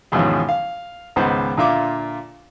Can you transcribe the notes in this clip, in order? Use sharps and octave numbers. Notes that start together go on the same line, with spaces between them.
D#2 G#2 B2 E3 F3 C#4
F5
C#2 G#2 D#3 B3 C5 F#5
A#2 D3 F4 E5 D6